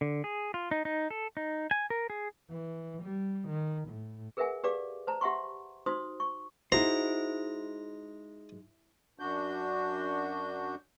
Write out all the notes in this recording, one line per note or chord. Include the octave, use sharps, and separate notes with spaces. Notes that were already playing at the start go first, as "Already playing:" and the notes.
D3
G#4
F4
D#4
D#4
A4
D#4
G#5
A#4
G#4
E3
G3
D#3
A2
G#4 A#4 B4 E5 F#5 G#5
G4 G#4 B4 D5 F5 D6
C5 A5 A#5
G4 E5 F#5 C6 C#6
D#4 F#4 C5 C6 D#6
C#6
G#3 D#4 E4 F#4 C5 A#5
F#2 D4 F#4 G6